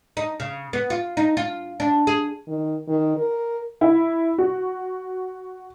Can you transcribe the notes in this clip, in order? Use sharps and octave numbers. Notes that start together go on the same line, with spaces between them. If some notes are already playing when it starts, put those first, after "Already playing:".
D#4
C#3
B3
F4
D#4
F4
D4
G#4
D#3
D#3
A#4
E4
F#4